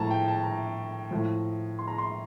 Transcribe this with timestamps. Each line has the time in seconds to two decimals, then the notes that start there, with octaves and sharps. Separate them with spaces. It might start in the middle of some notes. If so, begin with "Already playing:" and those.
Already playing: A2 F3 A5 A#5
0.10 G5
0.28 A5
0.43 A#5
1.11 A2 F3
1.79 C6
1.88 A#5
1.98 C6